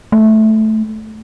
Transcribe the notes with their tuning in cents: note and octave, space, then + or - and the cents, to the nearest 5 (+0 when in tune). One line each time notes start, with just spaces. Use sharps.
A3 -10